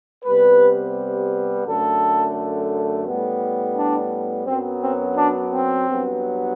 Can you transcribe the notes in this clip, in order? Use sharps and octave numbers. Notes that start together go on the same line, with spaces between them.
C3 G3 B3 B4
F#2 D3 A3 A4
A2 G3 B3
D4
F#2 F#3 B3 C4
C4
D4
C4
G2 F#3 B3